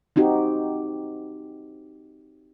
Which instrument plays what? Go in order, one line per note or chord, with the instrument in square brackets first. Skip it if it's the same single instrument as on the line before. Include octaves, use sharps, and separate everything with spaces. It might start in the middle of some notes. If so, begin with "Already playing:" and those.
[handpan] C4 D#4 F#4 G4